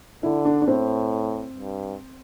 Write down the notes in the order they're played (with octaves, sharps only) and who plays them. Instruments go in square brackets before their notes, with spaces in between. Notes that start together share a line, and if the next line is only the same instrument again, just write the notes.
[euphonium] D3 [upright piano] E4
[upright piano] D4
D4
[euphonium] A2 [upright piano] C4
[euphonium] G2